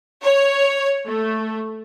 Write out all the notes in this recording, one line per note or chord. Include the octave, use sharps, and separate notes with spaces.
C#5
A3